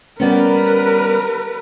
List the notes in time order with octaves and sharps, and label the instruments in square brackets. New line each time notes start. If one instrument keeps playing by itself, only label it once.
[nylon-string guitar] G3 B3 C#4 [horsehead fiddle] A#4 B4